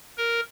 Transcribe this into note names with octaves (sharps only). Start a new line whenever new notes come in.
A#4